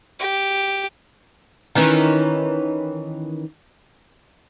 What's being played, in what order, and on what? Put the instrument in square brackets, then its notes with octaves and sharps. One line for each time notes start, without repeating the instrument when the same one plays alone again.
[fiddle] G4
[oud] D#3 E3 C#4